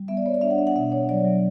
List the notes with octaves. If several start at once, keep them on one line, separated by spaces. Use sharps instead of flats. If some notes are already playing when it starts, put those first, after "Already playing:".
Already playing: G3
B3 E5
D5
B3 C#5
D5
D4 E5
F#5
D4 E5
F#5
B2 E5
D4 C#5
F#3 D5
F#3